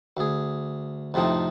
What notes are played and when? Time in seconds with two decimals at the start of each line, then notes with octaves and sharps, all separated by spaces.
0.17 D2 G#4
1.14 F2 A2 C3 F3 D#4